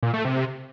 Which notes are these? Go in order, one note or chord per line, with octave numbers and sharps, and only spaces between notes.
A#2
A3
C3